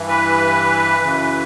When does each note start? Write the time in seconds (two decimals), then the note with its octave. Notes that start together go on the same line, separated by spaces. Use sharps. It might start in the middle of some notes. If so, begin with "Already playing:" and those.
Already playing: G2 E3
0.08 B4
1.01 F#2 C#3 E3